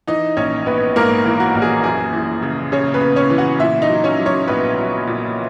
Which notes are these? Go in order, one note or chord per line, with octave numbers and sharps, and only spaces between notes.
E3 D#4 D#5
A#1 C#4 C#5
A#1 B3 B4
G#2 A#3 A#4
E3
F#4
A#1
G#4
F#2 G#4
E3
C#3
C#3 C#4 C#5
B3 B4
C#3
C#4 C#5
E3
F#4 F#5
A#2 E4 E5
D#4 D#5
F#3
C#4 C#5
F#3
C#4 C#5
A#1 B3 B4
F#3
A#2